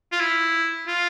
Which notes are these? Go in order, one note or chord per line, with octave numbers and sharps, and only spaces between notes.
F4
E4
F4